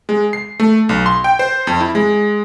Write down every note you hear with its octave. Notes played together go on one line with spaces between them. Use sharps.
G#3
C7
A3
B1
C6
G5
C5
F2
E4
G#3